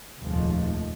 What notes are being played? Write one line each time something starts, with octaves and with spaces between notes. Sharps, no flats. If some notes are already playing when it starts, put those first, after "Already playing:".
F1 D#2 A#2 F3 G#3 A3